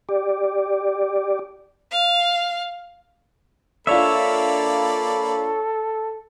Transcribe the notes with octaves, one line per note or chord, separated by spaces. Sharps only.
G4 D5
F5
A#3 D4 F4 A4 C#5 D5 E5 B5